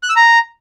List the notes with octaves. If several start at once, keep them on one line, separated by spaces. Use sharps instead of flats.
F#6
E6
A#5